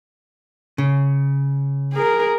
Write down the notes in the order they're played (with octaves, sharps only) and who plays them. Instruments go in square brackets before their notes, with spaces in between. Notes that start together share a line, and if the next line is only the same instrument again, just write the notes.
[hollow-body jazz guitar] C#3
[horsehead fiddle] G#4 A#4